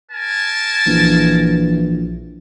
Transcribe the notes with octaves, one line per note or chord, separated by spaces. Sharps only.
A#4 G#5 A5
A#1 E3